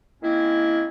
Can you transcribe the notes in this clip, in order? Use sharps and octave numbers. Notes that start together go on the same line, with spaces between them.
D#3 G#3 A#3 C4 C#4 E4